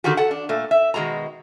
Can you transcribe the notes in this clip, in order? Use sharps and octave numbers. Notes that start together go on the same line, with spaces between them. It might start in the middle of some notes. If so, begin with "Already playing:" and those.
D3 D#3 D4 F#4 G4
A4 F#5
D4
A#2 A3
E5
B2 D#3 F3 G#3 F#4 A#5